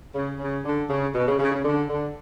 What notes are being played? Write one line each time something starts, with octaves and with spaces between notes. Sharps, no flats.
C#3
C#3
D3
C#3
B2
C#3
C#3
C#3
D3
D3